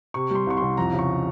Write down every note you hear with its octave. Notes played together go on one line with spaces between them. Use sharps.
C3 C#6
G3 C6
C2 C#6
C2 C6
F2 A#5
C#3
C#6